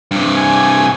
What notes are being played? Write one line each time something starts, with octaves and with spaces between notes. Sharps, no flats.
G2 C3
G#5